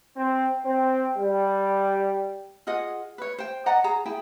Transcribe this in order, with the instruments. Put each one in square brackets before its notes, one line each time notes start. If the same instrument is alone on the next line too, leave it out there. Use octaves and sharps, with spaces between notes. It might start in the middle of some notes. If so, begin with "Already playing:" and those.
[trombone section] C4
C4
G3
[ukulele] F4 G#4 D#5 F#5
B4 C#5
C5 G5
D5 D#5 F#5 A#5
G#4 A#5
E4 G#4 G5